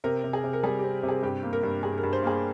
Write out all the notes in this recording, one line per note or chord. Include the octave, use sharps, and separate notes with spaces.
C3 A#4
C3
G#4
C3
A#4
G3 G#4
C4 G4
C3
G#4
G2 G4
A#3
A#4
G2
G2 G#4
A#4
G2
C5
A#3 G#4